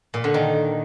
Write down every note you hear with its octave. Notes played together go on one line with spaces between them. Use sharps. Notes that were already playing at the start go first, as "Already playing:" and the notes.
A#2
D3
D#3